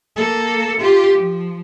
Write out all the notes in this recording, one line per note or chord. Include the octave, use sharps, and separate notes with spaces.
A#3 A4
F4 G4
F3